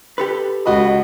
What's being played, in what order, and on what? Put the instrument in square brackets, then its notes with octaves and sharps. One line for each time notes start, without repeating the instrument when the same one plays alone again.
[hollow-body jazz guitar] G4 A4 B4
[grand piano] C#2 F#4 B5 [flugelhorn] D#5